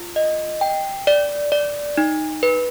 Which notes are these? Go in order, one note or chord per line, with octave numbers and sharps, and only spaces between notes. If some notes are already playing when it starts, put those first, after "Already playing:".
Already playing: F4
D#5
G5
D5
D5
D#4
B4